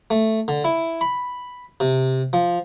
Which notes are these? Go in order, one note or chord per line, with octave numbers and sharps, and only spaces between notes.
A3
D3
E4
B5
C3
F3